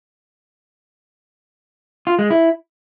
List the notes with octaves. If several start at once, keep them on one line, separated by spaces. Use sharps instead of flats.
F4
G#3
E4